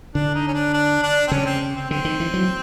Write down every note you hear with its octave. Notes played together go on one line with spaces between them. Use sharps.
D3 D4
D#4
C#4
D4
D4
D4
C4
C#3 C#4
C4
C4
D3 C4
D#3
E3
F#3